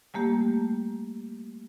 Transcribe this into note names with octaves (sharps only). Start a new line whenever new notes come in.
G3 A3 A#3 G4